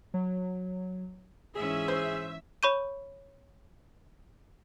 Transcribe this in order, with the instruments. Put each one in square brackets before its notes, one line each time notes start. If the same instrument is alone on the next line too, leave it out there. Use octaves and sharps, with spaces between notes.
[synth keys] F#3
[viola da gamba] G#2 E3 C#4 [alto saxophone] G#4 [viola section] E5
[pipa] C5
[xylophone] C#5 B5 C#6 G6 D#7